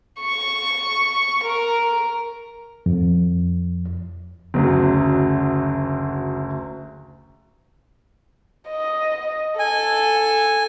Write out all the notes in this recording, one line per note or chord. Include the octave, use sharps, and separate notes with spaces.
C#6
A#4
F2
F#1 D2 F#3
D#5
A4 G#5